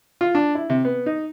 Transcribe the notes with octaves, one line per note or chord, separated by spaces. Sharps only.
F4
D4
E4
C3
B3
D#4